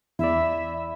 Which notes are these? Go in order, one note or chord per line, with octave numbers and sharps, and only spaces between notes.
E2 E4 D5 E5